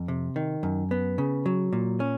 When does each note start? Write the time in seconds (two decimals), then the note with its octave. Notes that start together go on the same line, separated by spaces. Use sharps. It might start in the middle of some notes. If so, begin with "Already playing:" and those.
Already playing: F2
0.08 C3
0.36 D#3
0.63 F#2
0.91 B3
1.18 C#3
1.46 F#3
1.73 A#2
2.00 C#4